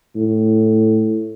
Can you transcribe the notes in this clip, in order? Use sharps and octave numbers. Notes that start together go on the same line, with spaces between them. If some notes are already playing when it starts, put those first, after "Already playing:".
A2